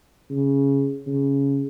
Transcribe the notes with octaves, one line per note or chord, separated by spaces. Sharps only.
C#3
C#3